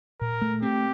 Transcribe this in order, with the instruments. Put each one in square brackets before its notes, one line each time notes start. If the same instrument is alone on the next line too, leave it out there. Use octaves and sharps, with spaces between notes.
[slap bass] A#2 [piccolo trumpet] A#4
[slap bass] A3
[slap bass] C4 [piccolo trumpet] G4